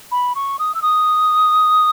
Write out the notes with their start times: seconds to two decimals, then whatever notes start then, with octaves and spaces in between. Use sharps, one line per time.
0.12 B5
0.35 C#6
0.59 D#6
0.75 E6
0.82 D#6